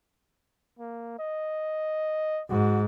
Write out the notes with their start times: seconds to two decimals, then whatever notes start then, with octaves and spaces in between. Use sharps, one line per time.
0.79 A#3
1.19 D#5
2.50 G#2 F#4